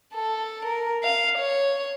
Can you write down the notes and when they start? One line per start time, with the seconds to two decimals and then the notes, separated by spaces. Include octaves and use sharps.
0.14 A4
0.65 A#4
1.04 F5
1.38 C#5